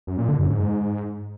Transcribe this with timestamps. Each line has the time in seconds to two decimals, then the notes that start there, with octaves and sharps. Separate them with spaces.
0.07 F#2
0.18 A#2
0.29 D3
0.39 F#2
0.50 G#2